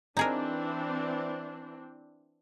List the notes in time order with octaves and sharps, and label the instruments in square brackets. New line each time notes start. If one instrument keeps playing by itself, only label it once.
[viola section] E3 C4 D4 [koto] D#4 G#4 A#4